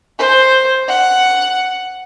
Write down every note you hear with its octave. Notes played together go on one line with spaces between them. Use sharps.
C5
F#5